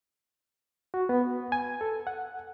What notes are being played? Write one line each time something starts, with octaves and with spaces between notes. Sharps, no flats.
F#4
B3
G#5
A4
F#5